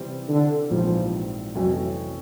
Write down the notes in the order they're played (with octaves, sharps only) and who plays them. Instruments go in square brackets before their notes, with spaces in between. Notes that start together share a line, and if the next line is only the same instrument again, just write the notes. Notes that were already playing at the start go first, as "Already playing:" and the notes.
Already playing: [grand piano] C3 E3 G3 C4
[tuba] D3
[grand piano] A#1 G#2 E3 G3 C4 [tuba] F3
[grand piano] F2 C3 E3 A3 C#4 [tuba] F#3